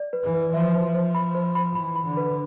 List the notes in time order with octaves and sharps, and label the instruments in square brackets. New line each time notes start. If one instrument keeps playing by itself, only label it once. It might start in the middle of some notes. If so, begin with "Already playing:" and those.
Already playing: [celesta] D5
B4
[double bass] E3
[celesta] B4
[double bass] F3 [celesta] E5
[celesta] C5
[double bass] F3
[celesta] C5
B5
C5
B5
[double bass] E3 [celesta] B5
[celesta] B5
[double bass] D3
[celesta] B4